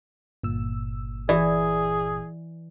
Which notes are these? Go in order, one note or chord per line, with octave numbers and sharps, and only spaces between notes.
G1 A#2 E6
E3 G#4 D5